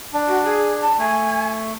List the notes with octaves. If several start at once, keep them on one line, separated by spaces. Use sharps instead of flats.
D4
F#4
G#4
A5
A3 G#5